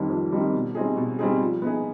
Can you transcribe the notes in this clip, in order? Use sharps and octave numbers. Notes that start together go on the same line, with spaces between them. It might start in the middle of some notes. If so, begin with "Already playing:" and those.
Already playing: F2 D#3 G3 C4 D#4
F2
D#3 G3 C4 D#4
B2
G3 C4 D#4 G#4
B2
G3 C4 D#4 G#4
F3
B3 D#4 G#4